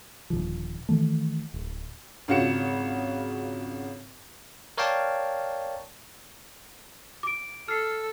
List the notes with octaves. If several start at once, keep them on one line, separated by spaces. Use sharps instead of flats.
D#1 D#2 D3 F3
D#3 E3 A3
D1
G#1 C#3 F4 F#4 C#7 E7
A#4 C#5 D5 F5 G5 A5
D6 D7
A4 F6 C7